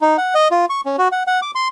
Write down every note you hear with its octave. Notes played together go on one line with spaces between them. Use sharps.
D#4
F#5
D#5
F4
C#6
C#4
F#4
F#5
F#5
D6
C6